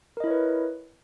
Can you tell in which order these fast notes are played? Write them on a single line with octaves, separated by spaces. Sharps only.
A#4 D#5 E4 C#5 B4